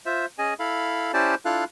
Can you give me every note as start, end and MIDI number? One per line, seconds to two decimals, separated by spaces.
0.06 0.26 65
0.06 0.26 72
0.06 0.26 76
0.38 0.54 61
0.38 0.54 68
0.38 0.54 75
0.38 0.54 80
0.59 1.12 64
0.59 1.12 69
0.59 1.12 77
0.59 1.12 83
1.13 1.35 61
1.13 1.35 64
1.13 1.35 67
1.13 1.35 72
1.13 1.35 74
1.13 1.35 81
1.45 1.64 62
1.45 1.64 64
1.45 1.64 65
1.45 1.64 69
1.45 1.64 77
1.45 1.64 90